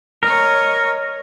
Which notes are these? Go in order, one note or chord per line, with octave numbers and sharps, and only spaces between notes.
A#4 C#5 D#5